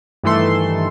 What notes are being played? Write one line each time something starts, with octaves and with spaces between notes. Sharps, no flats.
G2 D#3 E3 A3 A4 C6